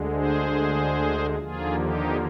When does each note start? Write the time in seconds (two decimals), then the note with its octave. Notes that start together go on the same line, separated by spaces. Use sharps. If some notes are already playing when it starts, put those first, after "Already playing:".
Already playing: D2 D3 G#3
0.14 G#4 C5
1.38 D#2 D3 F3 A#3 F4 G#4
1.79 D#4 G4